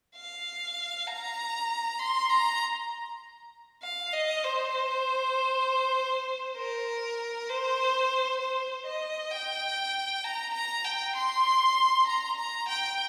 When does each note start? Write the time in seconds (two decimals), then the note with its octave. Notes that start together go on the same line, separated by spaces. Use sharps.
0.16 F5
1.07 A#5
1.99 C6
2.29 A#5
3.83 F5
4.13 D#5
4.44 C5
6.57 A#4
7.49 C5
8.41 C5
8.86 D#5
9.32 G5
10.24 A#5
10.54 A#5
10.85 G5
11.15 C6
12.07 A#5
12.38 A#5
12.68 G5